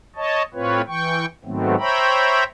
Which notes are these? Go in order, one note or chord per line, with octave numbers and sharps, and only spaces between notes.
C#5 D#5 A5
A2 C4 F4 B4 C#5
E3 G5 C#6
G#2 D#3 F#3 A3 B3 C4
C5 C#5 E5 G5 A#5 B5